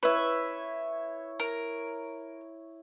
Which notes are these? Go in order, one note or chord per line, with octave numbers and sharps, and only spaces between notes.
E4 B4 C#5 E5
A#4